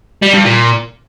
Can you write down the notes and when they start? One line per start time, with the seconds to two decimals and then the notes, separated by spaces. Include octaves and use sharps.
0.23 G3
0.34 G2
0.45 A#2